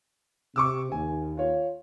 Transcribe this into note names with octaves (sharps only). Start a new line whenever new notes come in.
C3 C#6 D6 E6
D#2 G#5
F4 C#5